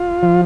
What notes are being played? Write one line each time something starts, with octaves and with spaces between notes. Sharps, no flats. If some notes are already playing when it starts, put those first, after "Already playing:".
Already playing: F4
F3